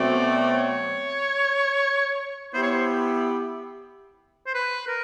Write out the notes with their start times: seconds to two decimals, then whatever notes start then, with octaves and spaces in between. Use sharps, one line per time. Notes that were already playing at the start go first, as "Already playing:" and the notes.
Already playing: B2 F#3 A3 C4 D5
0.54 C#5
2.53 B3 E4 G4 C5
2.62 C#5
2.71 C5
4.47 C5
4.54 B4
4.88 A#4